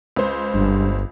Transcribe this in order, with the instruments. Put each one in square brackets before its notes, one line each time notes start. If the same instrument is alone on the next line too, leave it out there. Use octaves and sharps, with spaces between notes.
[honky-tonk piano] C#2 C5
[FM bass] G1 [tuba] G2